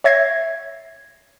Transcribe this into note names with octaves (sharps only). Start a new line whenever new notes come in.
C#5 E5 G#6 A#6 C7